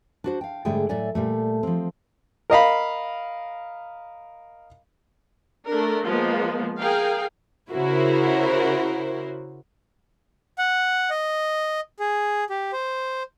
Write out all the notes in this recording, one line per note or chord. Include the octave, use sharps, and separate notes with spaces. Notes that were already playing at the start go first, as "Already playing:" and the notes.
D4 F#4 C5
F5 G5
G#2 D3 G3 A3 G#4 G5
A2 F#3 A4 D5 E5 G#5
A#2 G3 A3
F3 C4
A#4 D#5 F5 B5
A3 D4 A#4
F3 G#3 A#3 B3
G#4 A#4 F5 G5
C#3 E4 F#4 A#4 C5
F#5
D#5
G#4
G4
C5